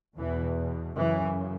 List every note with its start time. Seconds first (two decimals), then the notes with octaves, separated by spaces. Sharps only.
0.16 E2 B2 E3
0.97 F#2 C#3 E3